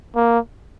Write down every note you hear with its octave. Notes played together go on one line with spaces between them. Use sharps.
A#3